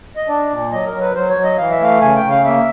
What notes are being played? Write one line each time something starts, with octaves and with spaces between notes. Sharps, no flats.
D#5
D4 D5
A#2
F#3 D#5
A#4
F#3
B4
F#3 C5
C#5
F#3
D#5
E3 F5
E5
A3 F5
C#3 G#5
G5
C#3
F5
A#3 E5